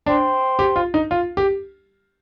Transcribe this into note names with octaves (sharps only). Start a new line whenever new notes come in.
D4 C5 G5 C6
G4
F4
D#4
F4
G4